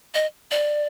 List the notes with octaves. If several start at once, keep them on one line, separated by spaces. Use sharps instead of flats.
D#5
D5